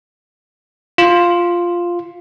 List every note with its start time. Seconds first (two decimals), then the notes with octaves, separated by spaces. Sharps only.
0.98 F4